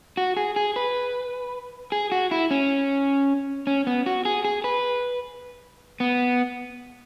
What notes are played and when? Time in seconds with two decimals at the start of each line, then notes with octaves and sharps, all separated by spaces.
0.17 F#4
0.37 G#4
0.56 G#4
0.76 B4
1.92 G#4
2.12 F#4
2.31 E4
2.51 C#4
3.67 C#4
3.87 B3
4.06 F#4
4.25 G#4
4.45 G#4
4.64 B4
6.00 B3